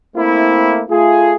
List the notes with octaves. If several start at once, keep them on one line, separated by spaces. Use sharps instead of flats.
A3 A#3 C4 E4
A3 F4 G#4